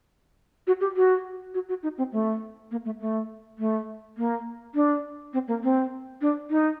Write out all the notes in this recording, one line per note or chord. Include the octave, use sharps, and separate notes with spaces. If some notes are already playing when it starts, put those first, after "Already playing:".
F#4
G4
F#4
F#4
F#4
D#4
C4
A3
A#3
A3
A3
A3
A#3
D4
C4
A#3
C4
D4
D#4